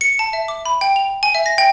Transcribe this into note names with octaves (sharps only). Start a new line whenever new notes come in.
C#7
A5
E5
D6
B5
G5
F7
G#5
E5
A#6
G5